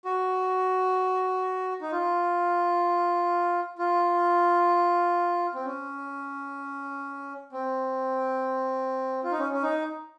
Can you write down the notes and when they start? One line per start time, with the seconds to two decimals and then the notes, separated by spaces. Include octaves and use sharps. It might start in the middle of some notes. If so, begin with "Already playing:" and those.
0.05 F#4
1.81 D#4
1.92 F4
3.78 F4
5.55 C4
5.65 C#4
7.52 C4
9.24 F4
9.32 D#4
9.39 C#4
9.52 C#4
9.63 D#4